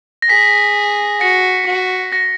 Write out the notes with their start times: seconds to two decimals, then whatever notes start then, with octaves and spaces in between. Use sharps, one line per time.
0.22 A#6
0.29 G#4 B6
1.20 F#4 A#6 C#7
1.66 F#4
2.12 A#6